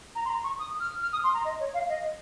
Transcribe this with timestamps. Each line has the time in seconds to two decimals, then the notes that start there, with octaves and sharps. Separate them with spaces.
0.15 A#5
0.25 C6
0.29 A#5
0.43 C#6
0.58 D#6
0.80 F6
1.02 F6
1.12 D#6
1.23 C6
1.33 A#5
1.44 D#5
1.59 C#5
1.73 F5
1.88 D#5